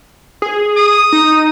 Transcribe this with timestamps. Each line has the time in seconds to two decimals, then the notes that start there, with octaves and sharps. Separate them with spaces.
0.42 G#4
0.76 D#6
1.12 D#4